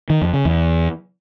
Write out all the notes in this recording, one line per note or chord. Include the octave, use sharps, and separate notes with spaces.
D#3
F2
C#3
E2